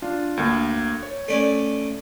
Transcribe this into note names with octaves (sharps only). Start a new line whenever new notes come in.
D4 F4
D2 A#3
C#5
A3 C#4 D5